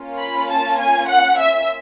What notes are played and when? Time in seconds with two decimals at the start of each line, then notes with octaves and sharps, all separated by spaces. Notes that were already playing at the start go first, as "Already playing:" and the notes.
Already playing: A#3 C#4 F4
0.20 B5
0.51 A5
0.80 G#5
1.08 F#5
1.38 E5